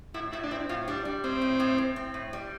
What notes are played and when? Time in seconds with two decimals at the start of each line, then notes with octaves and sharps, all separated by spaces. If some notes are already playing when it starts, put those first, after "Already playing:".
0.14 A2 E4
0.32 A2 E4
0.43 D4
0.51 C4 E4
0.69 A2 F4
0.88 G3 D4
1.05 G3
1.24 A2 C4
1.42 A2
1.60 A2
1.78 A2
1.96 C4
2.14 A2
2.33 G3